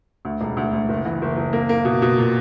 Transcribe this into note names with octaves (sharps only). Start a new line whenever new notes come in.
D2
E1
D2
D2
F#1
E3
F#1
F#1
A#3
A#3
B2
B2
A#2